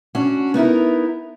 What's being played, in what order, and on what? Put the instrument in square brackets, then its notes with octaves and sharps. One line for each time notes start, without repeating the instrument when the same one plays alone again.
[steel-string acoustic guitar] C#4 D4 F#4
B3 D#4 E4 A#4